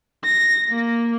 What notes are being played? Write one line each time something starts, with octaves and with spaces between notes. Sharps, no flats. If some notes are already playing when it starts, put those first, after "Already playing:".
A#6
A#3